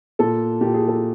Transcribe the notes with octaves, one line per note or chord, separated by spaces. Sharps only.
A#2 A4
A#2 G4
G#4
A4